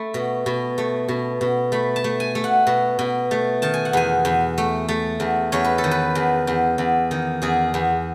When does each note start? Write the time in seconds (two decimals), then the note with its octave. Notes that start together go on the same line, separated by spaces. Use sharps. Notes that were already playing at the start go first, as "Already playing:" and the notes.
Already playing: A3 A5 B5
0.14 B2
0.46 B2
0.78 A3
1.08 B2
1.41 B2
1.72 A3 B5
1.96 A5
2.04 A3
2.20 G#5
2.35 A3
2.44 F#5
2.67 B2
2.99 B2
3.31 A3
3.62 D#3 A5
3.74 G#5
3.85 F#5
3.93 E2 G#5
4.25 E2
4.58 A3
4.88 A3
5.20 E2
5.52 E2 C#5
5.64 B4
5.78 A4
5.84 D#3
5.91 B4
6.15 E2
6.47 E2
6.78 E2
7.11 D#3
7.42 E2 G#4
7.74 E2